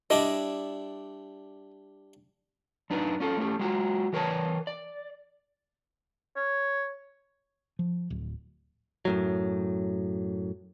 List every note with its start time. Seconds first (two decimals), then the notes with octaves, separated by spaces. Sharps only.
0.10 G3 D4 E4 D#5
2.90 F#2 D4 D#4 B4
3.20 C#4 F4 A4
3.37 A3 C#4 G4
3.59 G#3 F4 F#4
4.13 E3 A#4 B4 C#5 A5
4.67 D5
6.36 C#5
7.79 F3
8.10 D1
9.05 F#2 A2 F#3